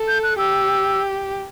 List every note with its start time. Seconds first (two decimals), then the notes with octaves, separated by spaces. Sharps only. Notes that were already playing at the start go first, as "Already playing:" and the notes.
Already playing: A4
0.08 G6
0.23 F#6
0.38 G4 E6